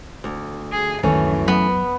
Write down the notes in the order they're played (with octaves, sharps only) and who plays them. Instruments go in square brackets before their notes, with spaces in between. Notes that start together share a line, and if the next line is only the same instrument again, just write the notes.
[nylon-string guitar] D2
[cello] G#4
[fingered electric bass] C#2 D#3 [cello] F#2 [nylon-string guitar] E3 A3 C#4
[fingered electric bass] F#3 [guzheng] B3